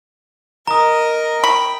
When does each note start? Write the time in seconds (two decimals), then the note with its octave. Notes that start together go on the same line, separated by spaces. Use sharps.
0.67 A#4 D#5 A#5 D#6
1.44 G5 B5